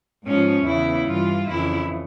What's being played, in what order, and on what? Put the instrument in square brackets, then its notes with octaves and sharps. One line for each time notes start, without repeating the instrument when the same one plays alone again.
[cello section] G#2 F3 C#4
E2 C#3 E3 E4
G2 E3 F4
F2 C#3 E3 E4